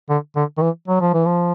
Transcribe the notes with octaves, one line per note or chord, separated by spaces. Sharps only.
D3
D3
D#3
E3
F#3
F3
E3
F3